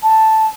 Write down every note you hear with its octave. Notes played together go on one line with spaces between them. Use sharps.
A5